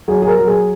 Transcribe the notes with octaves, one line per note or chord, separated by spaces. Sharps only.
F#3 G#4
G#4
A#4
F#3
G#4